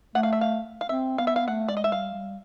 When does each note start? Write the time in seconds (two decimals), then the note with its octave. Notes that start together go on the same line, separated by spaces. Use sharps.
0.15 A3 F#5
0.23 F5
0.33 E5
0.41 F5
0.81 F5
0.89 C4 E5
1.18 B3 F5
1.27 E5
1.36 F5
1.48 A3 F#5
1.68 G#3 D5
1.77 D#5
1.84 E5
1.92 G3 F5
2.14 G3